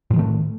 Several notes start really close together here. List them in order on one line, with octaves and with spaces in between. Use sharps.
A2 F3 D#3 A3